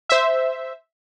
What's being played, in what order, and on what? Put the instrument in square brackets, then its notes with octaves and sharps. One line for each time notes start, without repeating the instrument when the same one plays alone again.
[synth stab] C5 E5